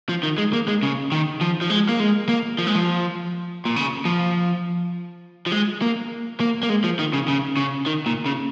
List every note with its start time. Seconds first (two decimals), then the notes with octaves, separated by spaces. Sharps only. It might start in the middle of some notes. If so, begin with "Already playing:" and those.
0.09 F3
0.23 D#3
0.38 G#3
0.53 A#3
0.68 G#3
0.83 C#3
1.12 D#3
1.41 F3
1.61 F3
1.70 G#3
1.89 A#3
2.00 G#3
2.29 A#3
2.59 F3
2.67 G#3
2.75 F3
3.65 A#2
3.76 C#3
4.05 F3
5.46 F3
5.52 G#3
5.82 A#3
6.40 A#3
6.63 A#3
6.69 G#3
6.84 F3
6.99 D#3
7.13 C#3
7.28 C#3
7.57 C#3
7.86 D#3
8.06 A#2
8.26 C#3